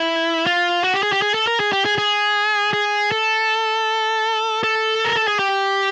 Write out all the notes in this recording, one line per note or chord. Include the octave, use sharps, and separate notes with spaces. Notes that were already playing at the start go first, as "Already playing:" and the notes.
Already playing: E4
F4
F#4
G4
G#4
G4
G#4
A4
A#4
G#4
G4
G#4
G#4
G#4
A4
A4
A#4
A4
G#4
G4